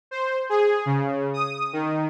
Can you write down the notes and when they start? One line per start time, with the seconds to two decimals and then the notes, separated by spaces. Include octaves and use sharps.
0.11 C5
0.49 G#4
0.86 C#3
1.34 D#6
1.73 D#3